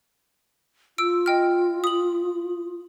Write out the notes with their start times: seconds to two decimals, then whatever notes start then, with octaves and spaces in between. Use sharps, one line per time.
0.98 F4 E6 D7
1.26 D#5 G5 F6
1.84 D#6 F#7